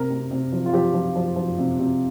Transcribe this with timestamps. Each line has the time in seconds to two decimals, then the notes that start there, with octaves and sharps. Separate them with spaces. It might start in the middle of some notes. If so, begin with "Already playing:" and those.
Already playing: C3 A#4
0.10 C3
0.31 C3
0.52 F3
0.66 F4
0.73 F3 G4
0.94 F3
1.16 F3
1.36 F3
1.58 C3
1.79 C3